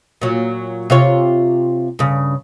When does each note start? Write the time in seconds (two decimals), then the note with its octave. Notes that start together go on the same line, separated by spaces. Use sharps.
0.22 A#2 F#3
0.90 C3 F4 C#5
1.99 G2 C#3